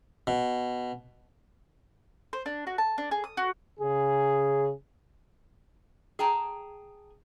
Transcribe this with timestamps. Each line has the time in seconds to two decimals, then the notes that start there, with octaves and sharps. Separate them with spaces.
0.27 B2
2.33 C5
2.46 D4
2.67 F#4
2.78 A5
2.98 D4
3.11 G#4
3.24 D#6
3.37 F#4
3.80 C#3 G#4
6.19 G#4 G5 A5 A#5